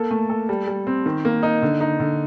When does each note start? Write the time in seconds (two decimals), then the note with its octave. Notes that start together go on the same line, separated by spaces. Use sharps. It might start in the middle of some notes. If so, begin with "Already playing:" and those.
Already playing: A#3 A4
0.11 A3
0.30 A4
0.49 G3
0.68 G3
0.87 C4
1.06 D#3
1.25 A#3
1.43 D#4
1.62 D3
1.81 D#4
2.00 D3